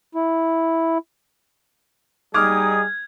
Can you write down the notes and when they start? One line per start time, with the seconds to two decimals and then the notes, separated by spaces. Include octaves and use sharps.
0.15 E4
2.34 G3 D#4 G#4 D6 D#6 F6 G#6